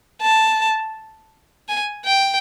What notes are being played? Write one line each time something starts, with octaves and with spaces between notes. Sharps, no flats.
A5
G#5
G5